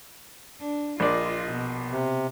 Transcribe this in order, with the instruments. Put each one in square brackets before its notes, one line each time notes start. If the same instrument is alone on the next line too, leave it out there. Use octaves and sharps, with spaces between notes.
[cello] D4
[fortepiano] A#1 D5 [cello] F4 D#5
[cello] B2
[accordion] C3